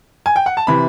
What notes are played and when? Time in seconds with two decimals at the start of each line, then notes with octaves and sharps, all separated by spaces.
0.26 G#5
0.36 G5
0.46 F#5
0.57 A5
0.67 C3 E3 B5